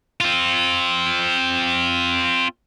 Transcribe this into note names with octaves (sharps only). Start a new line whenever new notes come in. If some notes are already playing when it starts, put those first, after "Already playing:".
C4 F4